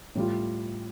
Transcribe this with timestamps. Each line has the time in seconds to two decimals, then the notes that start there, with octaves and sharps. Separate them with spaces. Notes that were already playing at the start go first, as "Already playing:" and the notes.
0.15 A2 G3 F4